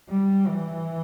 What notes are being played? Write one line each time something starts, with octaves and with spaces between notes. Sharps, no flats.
G3
E3